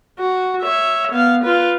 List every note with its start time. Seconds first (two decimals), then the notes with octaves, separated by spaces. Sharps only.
0.20 F#4
0.62 C#5 E5
1.12 B3 F5
1.43 F4 B4